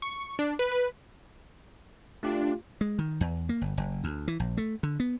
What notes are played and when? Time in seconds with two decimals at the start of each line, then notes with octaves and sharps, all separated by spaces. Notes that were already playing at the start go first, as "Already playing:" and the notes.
0.02 C#6
0.39 D4
0.59 B4
0.72 B4
2.23 A3 D4 F4 G4
2.81 G#3
2.99 D#3
3.21 E2
3.49 A#3
3.61 G1
3.77 F#1
4.04 D2
4.28 E3
4.40 A#1
4.57 A3
4.83 D3
5.00 B3